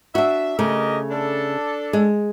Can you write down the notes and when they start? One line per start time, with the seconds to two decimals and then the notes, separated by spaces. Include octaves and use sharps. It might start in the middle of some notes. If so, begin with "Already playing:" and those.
0.15 D4 F#4 E5
0.59 C#3 A3 G4 A#4 D#5
1.11 D4 A4
1.93 G#3